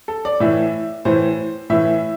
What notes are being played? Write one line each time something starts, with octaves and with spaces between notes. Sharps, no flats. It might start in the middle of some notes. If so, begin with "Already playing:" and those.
A4
D5
A2 E3 E5
A2 E3 C5
A2 E3 E5